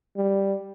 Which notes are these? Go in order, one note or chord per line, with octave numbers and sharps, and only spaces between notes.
G3